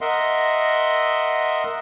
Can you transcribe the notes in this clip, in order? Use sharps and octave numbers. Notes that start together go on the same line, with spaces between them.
A#4 D#5 E5 F#5 C6